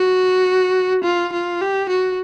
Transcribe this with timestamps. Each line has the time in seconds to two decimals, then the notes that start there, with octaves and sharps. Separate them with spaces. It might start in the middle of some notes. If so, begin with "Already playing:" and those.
Already playing: F#4
1.04 F4
1.33 F4
1.61 G4
1.89 F#4